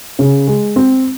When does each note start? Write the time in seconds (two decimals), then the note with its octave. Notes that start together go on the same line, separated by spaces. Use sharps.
0.19 C#3
0.48 G#3
0.76 C4